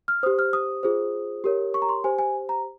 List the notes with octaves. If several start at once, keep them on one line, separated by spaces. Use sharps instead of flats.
F6
G4 C5 D#6
F6
D#6
F4 G#4 C5
G4 A#4 C#5
C#6
A#5
C6
G4 C5 G#5
G#5
A#5